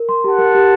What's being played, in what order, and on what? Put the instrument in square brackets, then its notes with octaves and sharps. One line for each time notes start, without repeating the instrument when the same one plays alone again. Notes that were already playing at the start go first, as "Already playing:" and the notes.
Already playing: [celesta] A#4
C6
[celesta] G4 [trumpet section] F#5 A5
[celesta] A#4
G4